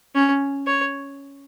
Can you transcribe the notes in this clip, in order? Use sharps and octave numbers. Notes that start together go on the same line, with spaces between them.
C#4
C#5